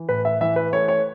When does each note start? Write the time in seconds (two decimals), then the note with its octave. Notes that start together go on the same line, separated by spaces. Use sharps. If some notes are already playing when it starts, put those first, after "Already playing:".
Already playing: E3
0.09 A2 B4
0.25 E5
0.41 E3 E5
0.56 B4
0.73 A3 C#5
0.88 C#5